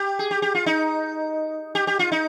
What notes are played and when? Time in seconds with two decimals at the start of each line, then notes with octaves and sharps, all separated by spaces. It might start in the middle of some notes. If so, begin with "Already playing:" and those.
Already playing: G4
0.19 G#4
0.31 G4
0.42 G4
0.55 F4
0.66 D#4
1.75 G4
1.87 G4
1.99 F4
2.12 D#4